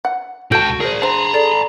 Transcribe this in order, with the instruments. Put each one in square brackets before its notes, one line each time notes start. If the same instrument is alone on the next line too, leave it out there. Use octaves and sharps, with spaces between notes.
[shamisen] F#5
[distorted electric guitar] C#2 G5 [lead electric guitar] F#4 [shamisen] A4 A5 [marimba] G6
[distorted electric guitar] G#4 [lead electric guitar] A#4 C5
[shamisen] D3 C5 [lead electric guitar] A5 A#5
[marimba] A4 D5